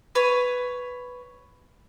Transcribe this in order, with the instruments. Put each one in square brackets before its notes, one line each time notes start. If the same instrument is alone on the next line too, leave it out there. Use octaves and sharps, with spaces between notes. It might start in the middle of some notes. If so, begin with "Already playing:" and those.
[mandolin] B4 C#5